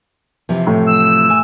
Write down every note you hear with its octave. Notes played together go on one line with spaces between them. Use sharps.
C3 E3 F3
A2
E6
G#5